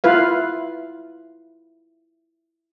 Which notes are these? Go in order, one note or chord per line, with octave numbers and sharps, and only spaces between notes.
E4 F4 B4 F5